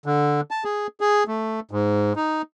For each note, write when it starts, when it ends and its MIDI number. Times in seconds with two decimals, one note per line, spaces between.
0.06 0.41 50
0.51 0.64 81
0.65 0.87 68
1.01 1.24 68
1.28 1.60 57
1.71 2.13 44
2.16 2.42 63